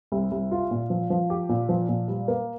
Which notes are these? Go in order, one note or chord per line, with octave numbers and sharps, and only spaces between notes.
C2
C2
F4
A#2
F3
F3
G4
A#2
F3
A#2
G3
A#3